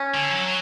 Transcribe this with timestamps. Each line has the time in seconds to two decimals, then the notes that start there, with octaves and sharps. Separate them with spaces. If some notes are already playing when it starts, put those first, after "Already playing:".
Already playing: C#4
0.14 D3
0.31 F#3